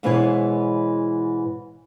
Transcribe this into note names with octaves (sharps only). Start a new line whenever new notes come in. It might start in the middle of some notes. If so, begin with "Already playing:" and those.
G#2 B2 E3 B3 E4 C#5